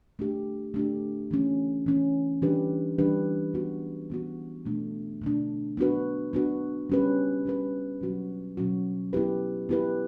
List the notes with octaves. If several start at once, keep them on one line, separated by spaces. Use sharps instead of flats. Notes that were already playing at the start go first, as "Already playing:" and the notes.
A3 D4 G4
A3 D4 G4
E3 A3 C#4
E3 A3 C#4
E3 G3 D4 G4 B4
E3 G3 D4 G4 B4
E3 B3 F#4
E3 B3 F#4
B2 A3 D4
B2 A3 D4
B3 D4 F#4 B4
B3 D4 F#4 B4
G3 C#4 G4 B4
G3 C#4 G4 B4
B2 F#3 C#4 F#4
B2 F#3 C#4 F#4
B3 E4 G4 B4
B3 E4 G4 B4